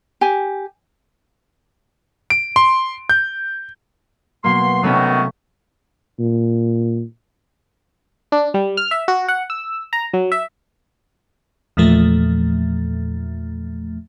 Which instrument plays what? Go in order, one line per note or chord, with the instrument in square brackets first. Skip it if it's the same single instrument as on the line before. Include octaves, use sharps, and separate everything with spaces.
[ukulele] G4 G#5
[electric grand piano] D7
C6
G6
[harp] B2 F#3 A#3 [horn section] C6
[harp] C3 A3 C#4 [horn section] D#3 F#3 B3
[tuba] A#2
[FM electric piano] D4
G3
F6
E5
F#4
F#5
E6
A#5
F#3
E5
E2 A#2 F3 A3